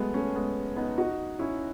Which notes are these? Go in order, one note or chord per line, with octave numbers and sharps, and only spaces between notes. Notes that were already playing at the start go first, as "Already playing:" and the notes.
Already playing: F#3 G#3 A3 B3
A3 C#4
G#3 B3
B3 D#4
D#4 F#4
C#4 E4